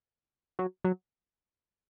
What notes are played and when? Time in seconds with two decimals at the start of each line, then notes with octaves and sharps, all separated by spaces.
0.59 F#3
0.84 F#3